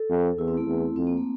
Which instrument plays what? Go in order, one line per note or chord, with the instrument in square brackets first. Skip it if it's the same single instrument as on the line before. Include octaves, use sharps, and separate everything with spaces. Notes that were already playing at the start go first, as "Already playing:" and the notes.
Already playing: [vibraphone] A4
[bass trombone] F2
[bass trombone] E2 [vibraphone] E4
[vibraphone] C4
A3
[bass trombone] E2
[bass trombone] F2 [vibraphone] C4
[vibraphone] A#3
A3